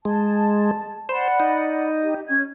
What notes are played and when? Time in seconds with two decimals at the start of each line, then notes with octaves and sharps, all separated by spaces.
0.05 G#3 A5
1.09 C5 D5 F#5 B5
1.40 D#4
2.03 G4
2.27 C#4 G#6